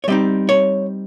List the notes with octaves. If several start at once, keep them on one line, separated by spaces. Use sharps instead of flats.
C#5
G3 C4 D#4 D#5
C#5